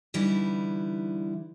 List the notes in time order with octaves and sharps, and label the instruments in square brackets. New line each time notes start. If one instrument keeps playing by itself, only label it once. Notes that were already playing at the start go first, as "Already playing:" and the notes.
[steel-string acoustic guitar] D3 E3 G3 D#4 E4